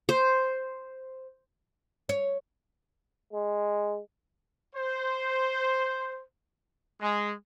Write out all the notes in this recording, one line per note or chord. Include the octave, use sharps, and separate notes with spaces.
C5
C#5
G#3
C5
G#3